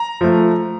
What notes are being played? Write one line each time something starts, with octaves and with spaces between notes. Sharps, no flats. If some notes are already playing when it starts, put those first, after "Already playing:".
Already playing: A#5
F3 A3